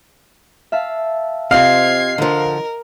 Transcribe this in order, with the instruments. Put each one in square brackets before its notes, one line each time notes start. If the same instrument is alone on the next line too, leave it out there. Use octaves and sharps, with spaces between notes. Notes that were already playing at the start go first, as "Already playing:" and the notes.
[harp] E5 F5 A5
[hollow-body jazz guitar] C3 C4 F4 [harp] D#5 [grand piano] F5 [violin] G#6 C7
[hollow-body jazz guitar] D3 F3 [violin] A#4